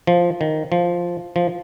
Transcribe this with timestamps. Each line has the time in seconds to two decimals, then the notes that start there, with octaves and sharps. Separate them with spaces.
0.07 F3
0.41 D#3
0.72 F3
1.36 F3